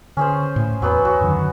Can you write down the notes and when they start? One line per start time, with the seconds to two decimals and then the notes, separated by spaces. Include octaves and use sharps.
0.17 D3 C#4 G#4 C5
0.56 A2
0.82 E2 F#3 B3
1.05 E2 F#4
1.21 F#2 D3 D#3